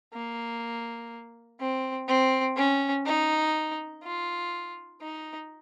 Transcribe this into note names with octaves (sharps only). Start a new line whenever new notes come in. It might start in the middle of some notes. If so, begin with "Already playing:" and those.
A#3
C4
C4
C#4
D#4
F4
D#4